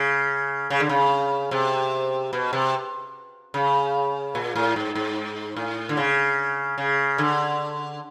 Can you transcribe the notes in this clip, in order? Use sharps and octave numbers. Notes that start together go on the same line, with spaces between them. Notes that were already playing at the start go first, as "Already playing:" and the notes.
Already playing: C#3
C#3
D3
C#3
C3
B2
C3
C#3
A#2
A2
G#2
G#2
A2
D3
C#3
C#3
D3